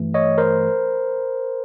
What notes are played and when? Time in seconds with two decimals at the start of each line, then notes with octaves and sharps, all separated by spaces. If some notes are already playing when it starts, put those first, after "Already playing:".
Already playing: G2 E3 A3
0.14 C#5 D#5
0.38 A#4 C5